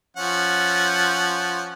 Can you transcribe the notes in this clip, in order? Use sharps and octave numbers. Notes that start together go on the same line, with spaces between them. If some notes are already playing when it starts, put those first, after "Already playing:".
F3 C#4 F#5